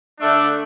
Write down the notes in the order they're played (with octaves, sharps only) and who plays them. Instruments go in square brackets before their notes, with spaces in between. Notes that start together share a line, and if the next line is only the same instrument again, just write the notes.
[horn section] D3 A3 D4